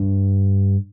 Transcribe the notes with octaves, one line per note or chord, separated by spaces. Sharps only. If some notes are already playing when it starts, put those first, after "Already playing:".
Already playing: G2